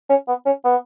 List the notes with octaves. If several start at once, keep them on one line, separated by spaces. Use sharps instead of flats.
C#4
B3
C#4
B3